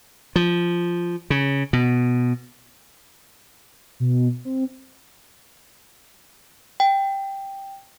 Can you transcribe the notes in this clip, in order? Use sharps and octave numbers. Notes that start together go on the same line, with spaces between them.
F3
C#3
B2
B2
C4
G5